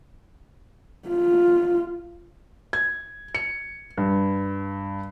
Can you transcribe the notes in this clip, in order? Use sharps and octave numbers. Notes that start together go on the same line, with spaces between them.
F4
G#6
C#7
G2